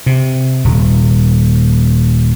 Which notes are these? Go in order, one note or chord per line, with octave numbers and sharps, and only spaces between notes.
C3
D#1